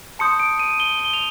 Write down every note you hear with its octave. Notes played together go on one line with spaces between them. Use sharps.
A5 C6 D#6 G6 C#7
D7
D#7
G7
G7
F7